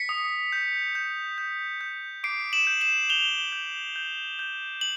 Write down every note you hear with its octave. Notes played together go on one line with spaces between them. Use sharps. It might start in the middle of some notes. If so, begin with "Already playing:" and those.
Already playing: B6 C#7
D#6
G6
G6
G6
G6
D6 C7 D7
E7 F#7
G6
E7 F#7
G6 F7 G7
G6
G6
G6
F#7